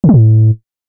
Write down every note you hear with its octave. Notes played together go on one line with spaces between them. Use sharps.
C#3
F#3
A2